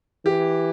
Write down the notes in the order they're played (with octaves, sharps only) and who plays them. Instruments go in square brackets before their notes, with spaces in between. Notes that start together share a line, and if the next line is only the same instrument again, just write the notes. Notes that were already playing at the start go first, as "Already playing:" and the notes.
[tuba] E3 [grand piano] G4